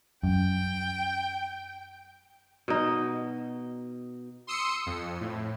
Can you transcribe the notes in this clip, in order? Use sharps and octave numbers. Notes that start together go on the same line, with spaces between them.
F#2 G5
B2 D#4
C6 D#6 E6 C#7
F2
A2